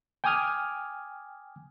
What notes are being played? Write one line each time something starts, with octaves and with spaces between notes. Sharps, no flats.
G5 G#5 D6 D#6 F6 G#6